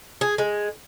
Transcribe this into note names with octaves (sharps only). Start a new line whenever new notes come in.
G#4
G#3